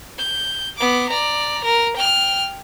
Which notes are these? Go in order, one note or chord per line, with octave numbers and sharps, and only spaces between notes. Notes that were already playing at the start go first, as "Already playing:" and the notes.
G6
B3 D6
D5 A#5
A#4
G5 F6